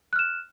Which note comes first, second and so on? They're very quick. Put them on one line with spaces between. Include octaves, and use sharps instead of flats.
F#6 F6 E7